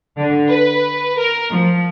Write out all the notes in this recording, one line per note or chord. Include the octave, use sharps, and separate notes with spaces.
D3
B4
A#4
F3